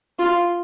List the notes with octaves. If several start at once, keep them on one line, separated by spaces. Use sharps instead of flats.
F4